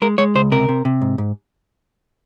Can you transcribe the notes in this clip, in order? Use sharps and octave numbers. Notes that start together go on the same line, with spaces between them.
G#3 A#4
G#3 C#5
C#2 C5
C3 A#4
C3
C3
G#2
G#2